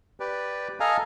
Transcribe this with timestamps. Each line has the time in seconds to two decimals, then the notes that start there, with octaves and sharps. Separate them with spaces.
0.20 G4 B4 D5
0.80 A4 D#5 F5 G#5 A#5